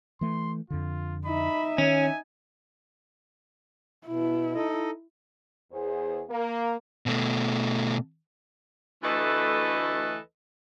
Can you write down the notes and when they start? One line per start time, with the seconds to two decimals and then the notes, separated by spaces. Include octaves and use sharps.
0.21 E3 A3 C6
0.70 F2 D3 F4
1.25 D#4 E5 B5
1.78 D#3 C#4 G#5
4.07 B2 E4
4.54 D#4 A4 D#5
5.72 E2 G#4 C5
6.29 A#3
7.06 B2 A3
9.03 D2 E3 A3 A4 B4 D#5